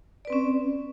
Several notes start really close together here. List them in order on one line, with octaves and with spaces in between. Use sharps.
D5 B4 C4 C#4